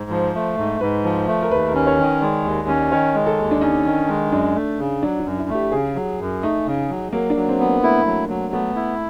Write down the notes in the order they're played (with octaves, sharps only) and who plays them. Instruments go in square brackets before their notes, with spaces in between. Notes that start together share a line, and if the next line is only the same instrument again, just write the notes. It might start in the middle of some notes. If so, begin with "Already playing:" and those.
Already playing: [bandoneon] G#2
[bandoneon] F3 [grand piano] C5
[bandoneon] A3
G#2
[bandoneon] G#2 [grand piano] B4
[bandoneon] F3
A3
[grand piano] A#4
[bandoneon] D#2 [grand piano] B4
[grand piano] A#4
[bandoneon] C#4
[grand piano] C#5
[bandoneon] D#3
[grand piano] D#5
[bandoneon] G#3 [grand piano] D5
[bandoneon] D#2
C#4
[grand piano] D5
[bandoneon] D#3 [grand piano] C#5
[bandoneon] G#3
[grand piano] A4
[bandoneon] D#2
[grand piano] D4
[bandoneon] C#4 [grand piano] D#4
[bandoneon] D#3
G#3
[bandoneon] F#2 [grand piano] D4
[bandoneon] A3
C#3
[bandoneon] F#3 [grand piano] D4
[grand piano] D4
[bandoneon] F#2
[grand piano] E4
[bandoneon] A3
[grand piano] G4
[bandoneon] C#3 [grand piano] G#4
[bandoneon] F#3
F#2
[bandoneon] A3 [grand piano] D#4
[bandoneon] C#3
F#3
[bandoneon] F#3 [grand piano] A#3
[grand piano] D4
[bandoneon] F#3
[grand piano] C4
[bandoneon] B3
[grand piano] A#3
[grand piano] A3 [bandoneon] E4
[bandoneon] F#3
F#3
[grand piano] A3 [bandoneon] B3
[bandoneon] E4